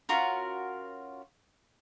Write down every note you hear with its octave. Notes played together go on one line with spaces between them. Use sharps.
C#4 F4 F#4 A#4